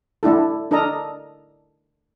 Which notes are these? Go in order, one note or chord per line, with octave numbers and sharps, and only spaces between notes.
A3 D4 E4 A4
D4 A4 A#4 D#5 A#5